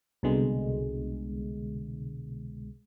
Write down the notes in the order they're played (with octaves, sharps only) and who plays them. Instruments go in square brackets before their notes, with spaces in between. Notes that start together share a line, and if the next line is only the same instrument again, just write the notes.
[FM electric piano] C2 B2 D3 G#3